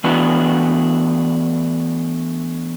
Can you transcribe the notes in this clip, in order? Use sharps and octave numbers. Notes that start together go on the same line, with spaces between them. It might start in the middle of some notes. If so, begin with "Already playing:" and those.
E3 A3 B3 D4 F#4 B4